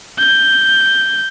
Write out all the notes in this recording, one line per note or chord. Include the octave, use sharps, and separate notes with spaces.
G6